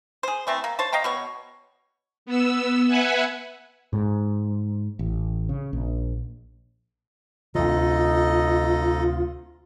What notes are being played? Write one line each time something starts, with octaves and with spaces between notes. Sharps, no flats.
G#4 C5
E3 A3 C4
A#3
C5 C#5 A5
D#5 F5 G5 A#5
B2 B3 C#5
B3 E6
B4 E5 F#5 G#5
G#2
A1
C#3
A#1
D2 C3 D#4 F4 A4 D#5